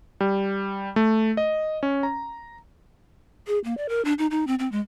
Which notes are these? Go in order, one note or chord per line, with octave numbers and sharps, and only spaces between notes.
G3
A3
D#5
C#4
A#5
G#4
A#3
D5
A#4
D4
D#4
D#4
C4
C4
G#3